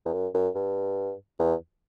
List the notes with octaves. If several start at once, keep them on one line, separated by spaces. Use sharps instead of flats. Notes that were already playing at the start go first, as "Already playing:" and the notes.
E2
F#2
F#2
G2
E2